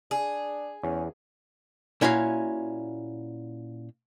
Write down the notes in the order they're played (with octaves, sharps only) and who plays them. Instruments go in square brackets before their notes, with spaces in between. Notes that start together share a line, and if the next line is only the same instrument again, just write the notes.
[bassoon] D4 [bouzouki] G#4
[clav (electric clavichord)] E2 [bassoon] C#4
[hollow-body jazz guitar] A#2 C#4 E4 F#4 A4 F5